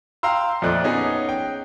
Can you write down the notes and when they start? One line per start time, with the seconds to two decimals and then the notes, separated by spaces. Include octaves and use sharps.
0.23 F5 G5 A#5 C6 E6
0.62 F2 A#2 A3 D5 D#5 F#6
0.84 B3 C#4 D#4 G#4
1.29 G5